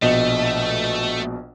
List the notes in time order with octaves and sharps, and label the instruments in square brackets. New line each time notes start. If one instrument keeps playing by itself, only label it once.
[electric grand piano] A#1 B2 [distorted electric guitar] A3 [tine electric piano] D#5